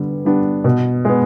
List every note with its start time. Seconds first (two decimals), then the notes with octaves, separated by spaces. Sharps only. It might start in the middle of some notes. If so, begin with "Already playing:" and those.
Already playing: D3 G3 B3
0.25 G3 B3 D4
0.64 B2
1.05 G#3 B3